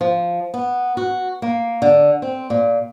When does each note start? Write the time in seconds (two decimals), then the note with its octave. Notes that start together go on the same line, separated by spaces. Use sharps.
0.01 F3
0.54 B3
0.97 F#4
1.42 A#3
1.82 D3
2.22 C4
2.50 A#2